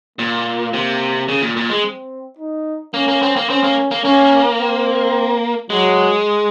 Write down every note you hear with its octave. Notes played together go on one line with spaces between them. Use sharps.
A#2 A#3
C3
C#3
A#2
A#2
G#3
C4
D#4
A#3 C#4
A#3
C4
A#3
C4 C#4
A#3
A#3
A#3 C#4
C4
F#3 G#3